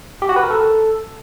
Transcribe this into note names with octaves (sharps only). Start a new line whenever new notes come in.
G4
F#4
B4
A#4
A4